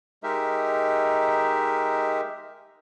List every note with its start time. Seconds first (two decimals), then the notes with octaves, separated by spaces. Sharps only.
0.23 G#3 D#4 G4 A#4 E5